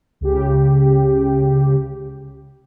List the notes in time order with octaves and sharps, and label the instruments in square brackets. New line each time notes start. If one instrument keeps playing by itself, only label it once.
[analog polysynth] C#2 C#3 G4